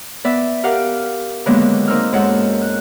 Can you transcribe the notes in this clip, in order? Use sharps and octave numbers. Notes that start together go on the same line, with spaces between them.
B3 D5 E5
G4 A#4 F5 F#5 F6
D3 D#3 F#3 G#3 A#3 B3
A#3 C4 D#4 E6 F6
F#2 G#3 A4 F#5
F#6